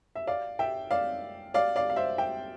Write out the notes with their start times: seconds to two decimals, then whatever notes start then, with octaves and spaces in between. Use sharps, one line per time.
0.15 E5
0.27 D5 F5
0.59 E5 G5
0.91 D5 F5
1.54 D5 F5
1.76 D5 F5
1.90 F5
1.96 C5 E5
2.18 E5 G5